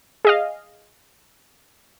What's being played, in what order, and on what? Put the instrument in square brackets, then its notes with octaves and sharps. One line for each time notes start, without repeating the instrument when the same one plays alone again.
[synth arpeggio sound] G#4 D#5 F5